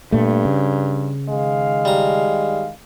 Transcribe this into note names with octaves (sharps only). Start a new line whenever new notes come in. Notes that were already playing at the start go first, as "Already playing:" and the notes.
G2 A#2 A3
C#3
D#3 G#3 F5
G3 A#5